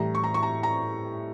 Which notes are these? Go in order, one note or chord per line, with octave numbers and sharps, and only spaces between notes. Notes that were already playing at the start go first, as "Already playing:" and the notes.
Already playing: A2 E3 G3 A#5
C#6
A#5
C#6
A#5
A#5